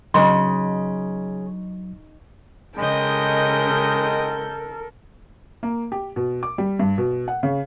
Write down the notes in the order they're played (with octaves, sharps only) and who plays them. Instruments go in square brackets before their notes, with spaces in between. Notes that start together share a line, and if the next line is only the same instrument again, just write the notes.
[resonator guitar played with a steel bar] C#3 [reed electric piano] F#3 [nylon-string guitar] D#4 D#5 [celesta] C6
[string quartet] C#3 G6 [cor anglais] G#3 [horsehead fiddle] A4 A#4 [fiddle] D#5 G5
[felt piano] A#3
G4
B2
D6
G3
G2
B2
F#5
C#3